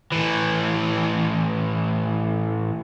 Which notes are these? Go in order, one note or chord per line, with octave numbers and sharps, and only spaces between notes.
A2 E3